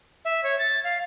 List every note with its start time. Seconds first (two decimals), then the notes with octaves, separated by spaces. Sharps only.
0.25 E5
0.43 C#5
0.59 A6
0.84 F5